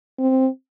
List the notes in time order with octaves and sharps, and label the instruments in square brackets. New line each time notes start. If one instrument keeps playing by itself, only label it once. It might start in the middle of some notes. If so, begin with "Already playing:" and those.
[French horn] C4